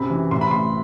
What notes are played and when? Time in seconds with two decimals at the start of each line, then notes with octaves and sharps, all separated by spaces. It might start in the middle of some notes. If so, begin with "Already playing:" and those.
Already playing: F#2 C3 B5
0.10 E3
0.31 A1 C6
0.41 B5
0.51 A2 C6